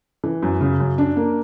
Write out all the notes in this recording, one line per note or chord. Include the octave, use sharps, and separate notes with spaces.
E3
F#2
C#3
F#2
D4
A#3